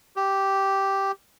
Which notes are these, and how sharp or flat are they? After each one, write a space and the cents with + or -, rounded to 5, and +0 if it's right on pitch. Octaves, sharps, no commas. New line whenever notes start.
G4 -5